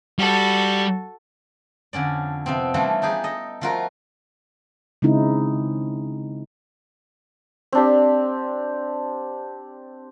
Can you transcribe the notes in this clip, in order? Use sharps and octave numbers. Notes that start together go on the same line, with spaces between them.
G3 F#4 A4
F2 D3 C#4 D5
C3 F3 B3 C4
E3 F3 G3 A3 C#4 D4
D4 D#4 G4 G#4
A4 D#5
F3 A3 F4 F#4 A#4
C#3 G#3 C4 D#4 E4
C4 D4 G4